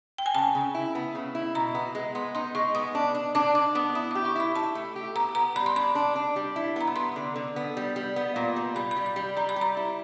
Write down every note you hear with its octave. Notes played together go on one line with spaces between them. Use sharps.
G5
G#5
C#3 A5
C#3
E4
B3
C#3
E4
B2 A#5
B3
G#3
B3 C6
D#4 C6
G#3 C#6
B3 D#6
D4
D4
D4 D6
D4 D6
B3 D#6
E4 D#6
G4 D6
C#6
E4 B5
E4 A5
A3
G4
B3 A#5
B3 A#5
G3 B5
C6
D4 B5
D4
D4
G3
E4
B3 A#5
B5
B3 C6
D3
D3
B3
G3
G3
B3
A#2
G3
G3 B5
B5
G3
B5
G3
G3 A#5
B5
G3
A#5
E4